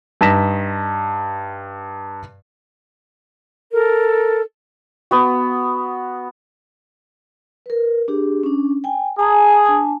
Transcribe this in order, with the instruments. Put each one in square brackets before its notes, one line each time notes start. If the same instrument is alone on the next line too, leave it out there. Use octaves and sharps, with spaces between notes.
[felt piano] G2 D#4 A#6 B6 E7
[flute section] A4 A#4
[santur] B3 F#4
[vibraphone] A#4 B4
D4 G4 G#4
C#4 D4
G5 G#5
[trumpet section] G#4 [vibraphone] A5 A#5 D#6
[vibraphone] D4 G#5 A5